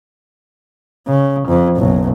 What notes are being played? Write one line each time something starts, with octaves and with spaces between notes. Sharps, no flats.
C#3
F2
F#1 B1